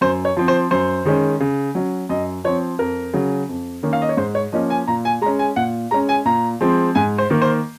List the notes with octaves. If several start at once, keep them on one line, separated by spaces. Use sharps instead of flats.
F#2 C5
C#5
F3 C4
C5
F#2 C5
D#3 G#3 C#4
C#3
F#3 C#4
F#2 D#5
F3 C4 C#5
F2 A#4
C#3 F#3 C#4
F2
D#3 A#3 C#4
F5
D#5
C#5
G#2 C5
C#5
F3 A#3 C#4 D#5
G#5
A#2 A#5
G#5
G#3 C#4 A#5
G#5
A#2 F#5
G#3 C#4 A#5
G#5
A#2 A#5
F3 G#3 C4
G#2 G#5
C5
D#3 A#3
C5